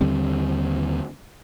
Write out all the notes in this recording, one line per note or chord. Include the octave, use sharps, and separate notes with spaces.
D#2 D3 G3 C4